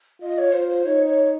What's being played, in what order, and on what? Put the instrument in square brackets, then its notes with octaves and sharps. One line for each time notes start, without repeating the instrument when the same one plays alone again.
[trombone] F4 [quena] D#5
[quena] C#5
[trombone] F4 [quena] C5
[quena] C5
[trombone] D#4 [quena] C#5
[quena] C#5